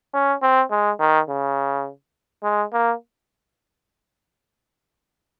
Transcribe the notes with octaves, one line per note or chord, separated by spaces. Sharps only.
C#4
C4
G#3
D#3
C#3
G#3
A#3